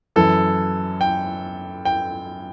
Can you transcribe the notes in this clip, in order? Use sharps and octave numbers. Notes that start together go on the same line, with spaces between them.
F#2 E3 A4
G5
G5